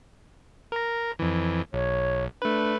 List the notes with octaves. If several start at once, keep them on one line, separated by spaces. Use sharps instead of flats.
A#4 A#5
F2 E3
B1 C#5
A3 D4 B4